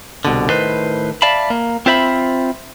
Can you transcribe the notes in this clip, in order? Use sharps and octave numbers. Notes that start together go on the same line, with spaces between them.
C2 B2 D3
A2 D#3 B4 C5
D5 E5 F5 A5 B5
A#3
C4 F4 C5 E5 A#5 B5